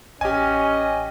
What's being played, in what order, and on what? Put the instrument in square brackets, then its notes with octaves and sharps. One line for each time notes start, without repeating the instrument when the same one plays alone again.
[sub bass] A1 [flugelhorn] C#4 [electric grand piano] G4 G#5 [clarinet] D#5